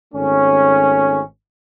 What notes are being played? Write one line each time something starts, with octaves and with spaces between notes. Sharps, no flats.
G#1 A3 C#4